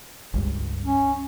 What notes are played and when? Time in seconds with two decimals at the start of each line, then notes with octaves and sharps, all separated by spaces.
0.34 F#1 C#2 G2
0.85 C#4